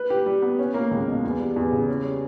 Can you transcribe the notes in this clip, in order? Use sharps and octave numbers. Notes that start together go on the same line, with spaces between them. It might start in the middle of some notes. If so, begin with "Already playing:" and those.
Already playing: B4
G4
G3
B3
C#4
A#3
C#2
B2
E2
G3
E2
C#3
C#4
G3